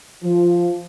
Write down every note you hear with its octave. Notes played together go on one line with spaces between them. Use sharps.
F3